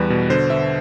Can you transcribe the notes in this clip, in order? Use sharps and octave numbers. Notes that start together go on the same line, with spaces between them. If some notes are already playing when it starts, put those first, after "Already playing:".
Already playing: E2 G3 B4
B2
D3 C5
D3 E5